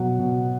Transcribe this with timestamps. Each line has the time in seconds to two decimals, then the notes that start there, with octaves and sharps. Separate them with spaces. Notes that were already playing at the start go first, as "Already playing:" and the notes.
Already playing: B2 F#3 F#5
0.20 B2